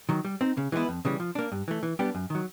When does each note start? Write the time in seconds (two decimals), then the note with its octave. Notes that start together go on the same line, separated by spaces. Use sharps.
0.09 D#3 F#3
0.25 G3
0.41 C4 D#4
0.57 C#3
0.72 E3 G#3 B3 E4
0.89 F2
1.05 C#3 E3 G3
1.20 F3
1.35 A#3 D4
1.52 G2
1.68 E3 A3
1.83 E3
1.99 G3 B3 D4 G4
2.15 F#2
2.30 D#3 F#3